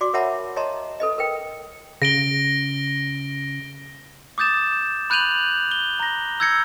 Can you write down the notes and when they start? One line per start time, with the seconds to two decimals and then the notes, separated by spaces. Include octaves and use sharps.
0.01 F#4 D5 C6 D6
0.13 A#4 C#5 E5 F#5 A5 B5
0.56 C#5 D#5 A5 A#5 C6
1.00 A4 B4 D#5
1.18 A#4 B4 G5
2.02 C#3 A#6 D7 G7
4.38 D6 D#6 G6 A6 E7
5.10 B5 F#6 G6 D#7 F7 F#7
5.71 G7
6.00 A#5 A#6
6.40 E6 G6 G#6 A#6 C#7